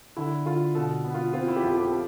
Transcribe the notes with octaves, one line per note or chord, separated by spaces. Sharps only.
D3 E4
D3 F4
B2 A4
B3
F4
C4 F4
E4
G4
F2 F4
G4
A4